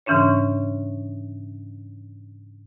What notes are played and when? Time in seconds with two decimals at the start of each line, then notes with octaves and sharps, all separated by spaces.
0.06 G#2 C#3 E3 C#4 D4 C#5